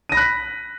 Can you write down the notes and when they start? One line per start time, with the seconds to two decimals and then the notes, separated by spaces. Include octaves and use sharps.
0.09 D#7
0.12 A#6
0.15 B5
0.17 F#6
0.20 B6